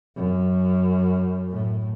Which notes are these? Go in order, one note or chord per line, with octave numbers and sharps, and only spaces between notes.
F#2
A2